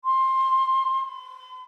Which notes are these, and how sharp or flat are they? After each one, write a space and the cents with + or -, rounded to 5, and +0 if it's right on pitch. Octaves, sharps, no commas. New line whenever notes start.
C6 +15
C6 -45